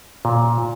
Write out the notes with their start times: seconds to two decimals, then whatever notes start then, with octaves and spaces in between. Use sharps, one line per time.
0.25 A#2